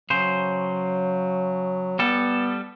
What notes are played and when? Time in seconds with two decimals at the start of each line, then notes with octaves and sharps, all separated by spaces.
0.10 C#3 F#3 C5
1.99 G3 B3 A4